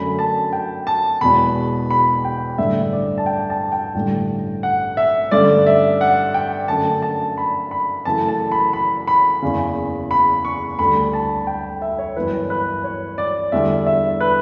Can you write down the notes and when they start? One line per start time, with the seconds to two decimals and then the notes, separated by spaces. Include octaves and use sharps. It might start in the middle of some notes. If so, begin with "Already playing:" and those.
Already playing: F#2 D3 F#3 A3 C#4 B5
0.19 A5
0.53 G5
0.87 A5
1.21 E1 E2 B2 B5
1.90 B5
2.25 G5
2.58 A1 G2 D3 G3 E5
2.93 D5
3.18 A5
3.26 G5
3.50 A5
3.72 G5
3.95 A1 G2 D3 G3
4.63 F#5
4.97 E5
5.31 G2 D3 A3 C#4 D5
5.66 E5
6.01 F#5
6.34 G5
6.68 F#2 D3 A3 C#4 A5
7.02 A5
7.38 B5
7.71 B5
8.05 F#2 C#3 E3 A3 A5
8.28 A5
8.52 B5
8.73 B5
9.07 B5
9.42 F#1 E2 C#3
10.11 B5
10.45 C#6
10.79 D2 D3 G3 B5
11.13 A5
11.47 G5
11.82 E5
11.99 C#5
12.16 G1 F#2 E3 B4
12.50 B4
12.84 C#5
13.18 D5
13.52 E2 D3 G3 E5
13.86 E5
14.20 B4